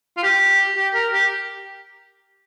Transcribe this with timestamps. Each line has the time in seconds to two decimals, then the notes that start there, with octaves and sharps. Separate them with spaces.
0.17 F4
0.23 G4
0.76 G4
0.95 A#4
1.13 G4